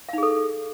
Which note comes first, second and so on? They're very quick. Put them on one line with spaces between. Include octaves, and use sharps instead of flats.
F5 D#4 G#4 A4